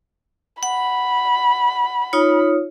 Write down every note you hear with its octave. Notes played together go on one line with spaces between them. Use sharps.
F#5 B5
D#4 F4 C#5